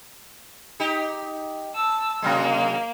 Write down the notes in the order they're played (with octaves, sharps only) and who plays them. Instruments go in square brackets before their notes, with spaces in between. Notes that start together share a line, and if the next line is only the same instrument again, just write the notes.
[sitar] D#4 G4
[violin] A5 E6
[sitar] C3 F#3 G#3 [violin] A#3